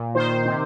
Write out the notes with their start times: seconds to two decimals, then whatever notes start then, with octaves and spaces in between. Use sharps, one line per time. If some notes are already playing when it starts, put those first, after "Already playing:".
Already playing: A#2
0.15 D#3 C5
0.45 C3